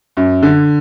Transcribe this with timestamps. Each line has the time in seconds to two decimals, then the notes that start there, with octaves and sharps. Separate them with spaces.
0.17 F#2
0.43 D3